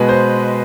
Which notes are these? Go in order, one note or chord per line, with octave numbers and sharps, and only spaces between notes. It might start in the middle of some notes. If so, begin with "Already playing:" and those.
Already playing: B2 G#3 B4
C5